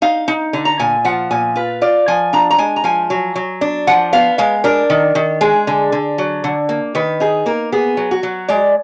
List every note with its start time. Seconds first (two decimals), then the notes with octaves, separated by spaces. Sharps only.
0.02 D#4 F5
0.28 D#4
0.53 D3
0.65 A#5
0.79 A#2 G#5
1.05 F3 F#5
1.31 A#2 G#5
1.56 F4 B4
1.82 F4 D5
2.08 F3 G#5
2.33 D4 A#5
2.51 A#5
2.58 G#3 G#5
2.76 A#5
2.84 F3 G#5
3.10 F#3
3.35 F#3
3.61 D4
3.87 F3 F#5
4.13 B3 F5
4.38 G#3 F5
4.64 D4 A#4
4.90 D#3
5.15 D#3
5.41 G#3 G#4
5.67 D3
5.92 D3
6.18 F#3
6.44 D3
6.69 A#3
6.95 D#3 B4
7.20 D#4 G#4
7.46 A#3 A#4
7.72 B3 G#4
7.97 F#3
8.11 F#4
8.23 F#3
8.48 G#3 D5